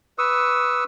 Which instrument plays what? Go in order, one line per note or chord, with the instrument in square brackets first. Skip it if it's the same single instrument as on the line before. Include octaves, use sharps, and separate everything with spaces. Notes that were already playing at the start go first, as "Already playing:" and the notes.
[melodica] B4 C#6 D#6 E6